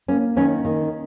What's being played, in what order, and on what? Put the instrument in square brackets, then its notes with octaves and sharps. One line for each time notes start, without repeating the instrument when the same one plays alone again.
[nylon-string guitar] A#3 C#4
D#3 C#4
D#3